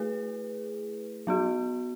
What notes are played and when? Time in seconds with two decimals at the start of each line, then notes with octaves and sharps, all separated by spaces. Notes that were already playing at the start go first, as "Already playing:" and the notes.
Already playing: A3 E4 G#4 B4
1.27 F#3 B3 F#4